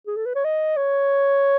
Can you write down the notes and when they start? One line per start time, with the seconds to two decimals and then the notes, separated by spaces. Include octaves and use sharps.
0.07 G#4
0.17 A4
0.26 B4
0.35 C#5
0.44 D#5
0.77 C#5